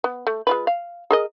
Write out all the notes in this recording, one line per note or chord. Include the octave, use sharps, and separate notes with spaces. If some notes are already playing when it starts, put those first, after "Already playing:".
B3
A3
G#3 F4 B4
F5
G#4 A#4 D#5